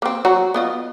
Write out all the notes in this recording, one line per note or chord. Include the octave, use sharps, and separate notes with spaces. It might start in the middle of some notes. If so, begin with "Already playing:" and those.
A#3 C4
F#3 F#4 A#5
B3 F4 D#5